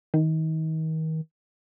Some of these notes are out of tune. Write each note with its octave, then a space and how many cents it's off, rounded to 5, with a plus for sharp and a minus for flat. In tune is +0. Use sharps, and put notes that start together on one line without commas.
D#3 +35